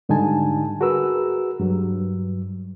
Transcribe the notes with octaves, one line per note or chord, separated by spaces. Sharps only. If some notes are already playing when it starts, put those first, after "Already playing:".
G#2 D3 G3 D#4 G#5 A5
F#4 G#4 A#4 B4 E6
G2 F#3